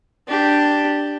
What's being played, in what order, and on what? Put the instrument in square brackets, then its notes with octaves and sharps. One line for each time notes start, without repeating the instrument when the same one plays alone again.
[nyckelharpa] D4 G4